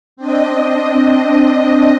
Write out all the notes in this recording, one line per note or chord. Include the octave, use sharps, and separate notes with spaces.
C4 D4 D#5